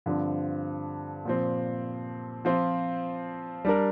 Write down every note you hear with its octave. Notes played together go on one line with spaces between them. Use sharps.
G2 D3 F3 C4
A#2 F3 C4
F3 C4 F4
G3 D4 A#4